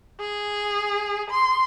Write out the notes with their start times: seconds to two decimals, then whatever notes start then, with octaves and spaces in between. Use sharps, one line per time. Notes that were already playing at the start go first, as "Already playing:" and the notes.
0.20 G#4
1.30 C6